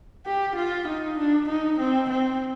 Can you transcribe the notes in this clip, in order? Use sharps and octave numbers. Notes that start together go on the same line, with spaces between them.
G4
F4
D#4
D4
D#4
C4
C4